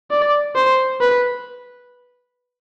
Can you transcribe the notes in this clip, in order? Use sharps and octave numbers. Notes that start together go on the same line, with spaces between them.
D5
C5
B4